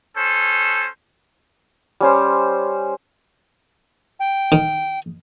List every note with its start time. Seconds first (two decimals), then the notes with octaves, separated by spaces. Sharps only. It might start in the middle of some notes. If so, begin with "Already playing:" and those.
0.16 C#4 A4 C5
2.01 G3 C#4 C5
4.20 G5
4.52 D#3